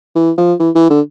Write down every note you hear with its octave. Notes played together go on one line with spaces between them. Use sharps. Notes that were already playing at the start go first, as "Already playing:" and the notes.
E3
F3
E3
E3
D3